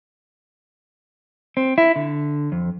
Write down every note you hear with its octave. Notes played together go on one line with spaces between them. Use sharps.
C4
E4
D3
F2